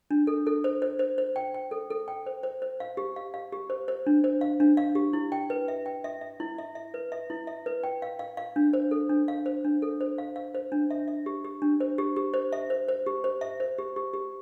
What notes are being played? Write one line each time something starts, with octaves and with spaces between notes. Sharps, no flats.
D4
A4
A4
C5
C5
C5
C5
G5
G5
A4
A4
G5
C5
C5
C5
F5
G4
F5
F5
G4
C5
C5
D4
C5
F5
D4
F5
G4
E4
G5
B4
E5
G5
E5
E5
E4
E5
E5
B4
E5
E4
E5
B4
G5
F5
F5
F5
D4
C5
A4
D4
F5
C5
D4
A4
C5
F5
F5
C5
D4
E5
E5
G4
G4
D4
C5
G4
G4
C5
E5
C5
C5
G4
C5
E5
C5
G4
G4
G4